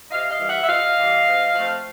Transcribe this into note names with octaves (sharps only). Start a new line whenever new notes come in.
C3 D#5 F5
D#5 F5
E3 G3
E5 F#5
E5
C3 D#5 F5
E3 G3
G#2
F3 A3 C4